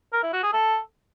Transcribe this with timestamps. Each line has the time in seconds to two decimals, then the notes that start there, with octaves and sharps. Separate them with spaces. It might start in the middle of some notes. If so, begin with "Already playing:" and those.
0.13 A#4
0.23 E4
0.33 F#4
0.43 G#4
0.53 A4